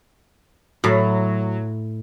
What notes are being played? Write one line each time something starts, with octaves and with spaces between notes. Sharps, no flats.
A2 F#3